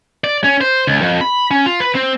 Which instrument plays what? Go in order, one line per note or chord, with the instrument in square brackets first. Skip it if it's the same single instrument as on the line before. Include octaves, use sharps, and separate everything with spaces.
[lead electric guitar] D5
C#4
C5
C#2
F2
B5
C#4
F4
B4
C4